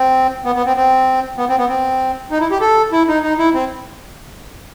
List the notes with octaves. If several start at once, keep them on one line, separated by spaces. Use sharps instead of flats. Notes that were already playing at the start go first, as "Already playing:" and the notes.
Already playing: C4
B3
B3
C4
C4
B3
C4
B3
C4
D#4
E4
G4
A4
E4
D#4
D#4
E4
C4